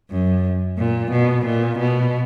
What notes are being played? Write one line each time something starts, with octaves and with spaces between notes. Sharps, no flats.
F#2
A#2
B2
A#2
B2